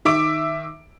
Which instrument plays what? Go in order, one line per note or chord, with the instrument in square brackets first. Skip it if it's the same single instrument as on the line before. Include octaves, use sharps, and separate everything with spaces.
[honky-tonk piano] D#3 E5 D6 D7